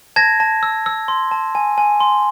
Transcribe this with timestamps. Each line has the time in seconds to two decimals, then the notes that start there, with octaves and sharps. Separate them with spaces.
0.16 A5 G#6 A#6
0.40 A5
0.63 E6
0.86 E6
1.08 C6
1.31 A5
1.55 G#5
1.78 G#5
2.00 C6